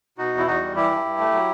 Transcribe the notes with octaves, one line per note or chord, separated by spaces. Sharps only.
B2 D#4 F#4
E2
E4
E2 D#4 F#4
G3
E3 E4 G4
G2
G2
A3
F#3